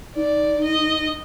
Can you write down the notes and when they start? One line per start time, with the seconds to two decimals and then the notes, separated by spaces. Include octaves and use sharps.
0.16 D#4 D5
0.64 D#5